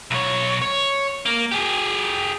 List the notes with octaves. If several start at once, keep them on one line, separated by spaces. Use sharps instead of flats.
B1 C#5
C#5
A#3
G4 G#4